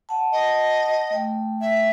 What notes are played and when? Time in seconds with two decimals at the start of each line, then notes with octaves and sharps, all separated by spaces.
0.09 F#5 A5
0.32 D#5
1.11 A3 G5
1.61 E5